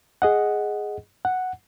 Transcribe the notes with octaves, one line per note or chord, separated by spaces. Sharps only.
G#4 D#5 F#5
F#5